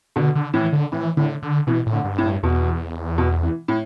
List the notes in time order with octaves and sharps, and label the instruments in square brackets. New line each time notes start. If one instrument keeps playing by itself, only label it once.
[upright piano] B2 [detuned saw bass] D3
[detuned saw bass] D3
[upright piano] A2 [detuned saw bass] E3
[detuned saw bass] D3
[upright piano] A2 [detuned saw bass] E3
[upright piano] A2 [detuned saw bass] D3
[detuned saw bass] D3
[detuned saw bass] B2 [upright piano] E3
[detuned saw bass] A2
[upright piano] D3
[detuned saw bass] G2
[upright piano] A2
[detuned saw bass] G2
[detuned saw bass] E2 [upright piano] B2
[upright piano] B2
E3
A2